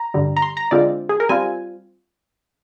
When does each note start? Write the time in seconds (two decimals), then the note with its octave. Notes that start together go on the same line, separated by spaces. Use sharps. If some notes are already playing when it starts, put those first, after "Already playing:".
Already playing: A#5
0.14 G2 D3 G3
0.37 A#5
0.42 C6
0.57 A#5
0.71 D3 G#3 C4 F4 D5
1.09 G#4
1.20 A#4
1.29 G3 C4 F4 G#5